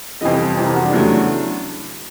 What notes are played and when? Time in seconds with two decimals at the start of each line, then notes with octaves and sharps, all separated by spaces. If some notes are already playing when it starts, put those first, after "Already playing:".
0.21 F2 C3 E3 G3 D#5
0.57 F2 C3 E3 G3
0.66 A#4
0.74 F#4
0.84 D4
0.93 E2 C#3 F#3 A3